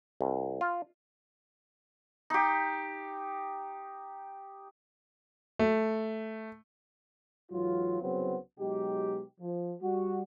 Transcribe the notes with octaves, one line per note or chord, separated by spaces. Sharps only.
C2
F4
D#4 G4
A3
G#2 E3 F#3 F4
C2 C#3 F#3 B3 C4 C5
B2 F#3 G#3 D#4 G4
F3
G3 F#4